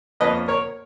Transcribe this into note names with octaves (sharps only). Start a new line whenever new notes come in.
F2 F3 A#3 C#4 B4 D#5
A#4 C#5